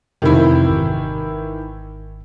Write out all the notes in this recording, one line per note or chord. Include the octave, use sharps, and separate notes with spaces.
F2 C3 D#3 E3 E4
G#1